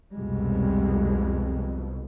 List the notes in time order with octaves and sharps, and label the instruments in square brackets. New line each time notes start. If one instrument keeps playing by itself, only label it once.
[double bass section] C2 F2 B2 [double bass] G3 G#3